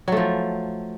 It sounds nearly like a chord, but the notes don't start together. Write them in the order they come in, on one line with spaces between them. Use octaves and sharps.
F#3 A3 F3